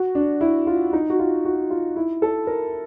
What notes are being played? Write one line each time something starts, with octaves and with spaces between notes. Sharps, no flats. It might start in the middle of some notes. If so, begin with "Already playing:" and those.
Already playing: F#4
D4
E4
F4
D#4
F#4
F4
F#4
F4
E4
A4
A#4